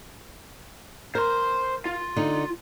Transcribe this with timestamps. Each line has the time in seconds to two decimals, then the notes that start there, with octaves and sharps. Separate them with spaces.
1.15 A#4 C5 C6
1.86 F4
2.16 D3 D#4